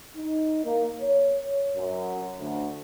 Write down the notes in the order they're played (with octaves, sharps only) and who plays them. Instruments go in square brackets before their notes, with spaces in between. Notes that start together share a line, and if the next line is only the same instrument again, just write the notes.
[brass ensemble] D#4
A#3
C#5
F#2
D2